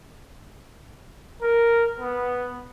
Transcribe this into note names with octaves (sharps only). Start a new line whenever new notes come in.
A#4
B3